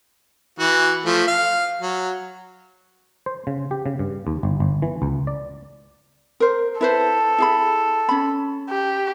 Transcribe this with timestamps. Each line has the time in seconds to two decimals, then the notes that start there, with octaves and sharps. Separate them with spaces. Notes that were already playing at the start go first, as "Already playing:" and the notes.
0.59 E3 F#4
1.05 F3 A3
1.28 F5
1.82 F#3
3.26 C5
3.47 C#3
3.71 G4
3.86 C#3
3.99 G2
4.27 D#2
4.43 G1
4.60 G1
4.82 E3
5.02 C#2
5.27 D5
6.40 A#4 C5
6.81 E4 A4 B4 C5
7.38 E4 G#4 B5
8.09 C#4 B5
8.69 G4